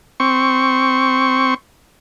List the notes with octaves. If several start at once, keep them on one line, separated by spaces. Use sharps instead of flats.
C4 C#6